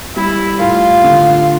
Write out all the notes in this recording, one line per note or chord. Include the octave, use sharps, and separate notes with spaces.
G3 E4
A2 F4
D3